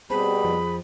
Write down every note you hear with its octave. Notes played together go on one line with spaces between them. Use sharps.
B2 G3 C4 G#4 C5 A5 B5
F2 F3 C4